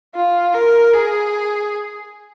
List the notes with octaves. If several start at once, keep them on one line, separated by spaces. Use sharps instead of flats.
F4
A#4
G#4